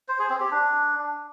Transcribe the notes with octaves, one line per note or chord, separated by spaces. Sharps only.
C5
G#4
C4
G4
D4